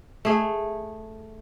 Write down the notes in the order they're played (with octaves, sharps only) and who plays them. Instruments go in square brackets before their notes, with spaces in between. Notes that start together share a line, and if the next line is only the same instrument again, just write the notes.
[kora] A3 G#4